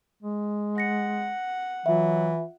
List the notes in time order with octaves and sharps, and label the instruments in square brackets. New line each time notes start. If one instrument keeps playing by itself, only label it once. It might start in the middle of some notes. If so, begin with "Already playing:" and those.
[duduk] G#3
[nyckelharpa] F#5 [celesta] A#6 C#7
[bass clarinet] E3 [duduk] F#3 [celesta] F4 E5